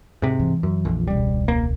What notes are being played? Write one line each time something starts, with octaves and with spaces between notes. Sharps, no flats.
G#2 C3
E3
F#2
A#1 F2
E1 C#2 G3
A#3